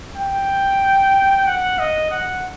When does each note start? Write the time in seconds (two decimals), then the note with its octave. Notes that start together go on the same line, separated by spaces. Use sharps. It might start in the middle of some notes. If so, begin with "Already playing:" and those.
0.16 G5
1.46 F#5
1.79 D#5
2.11 F#5